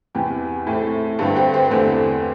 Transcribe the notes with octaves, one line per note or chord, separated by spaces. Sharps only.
E2 C3 E3 G4
A2 A3 C4
G2 D3 C4 A4
G4 C5
G4 C5
E2 D3 A3 C4